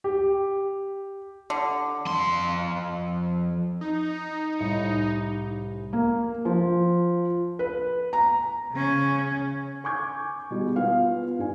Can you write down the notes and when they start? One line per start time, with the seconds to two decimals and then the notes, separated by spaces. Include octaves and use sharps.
0.04 G4
1.50 D3
2.06 F2 C6
3.81 D#4
4.59 C2 A2 C#7
5.93 A#3
6.45 F3
7.59 B4
8.13 A#5
8.72 C#3 C#4
9.84 G#5 C#6 D6 G6 G#6
10.51 B2 G3 G#3
10.76 B3 F4 F5
11.39 G2 G#5